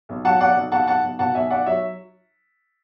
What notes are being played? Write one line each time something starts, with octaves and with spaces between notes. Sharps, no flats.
B1
F#3 F#5 A5
B1 D5 F#5
B1
B1 F#5 A5
B1 F#5 A5
B1
B2 F#5 A5
B1 E5 G#5
B1 D5 F#5
F#3 C#5 E5